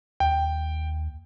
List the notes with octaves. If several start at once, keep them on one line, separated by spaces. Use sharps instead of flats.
D#2 G5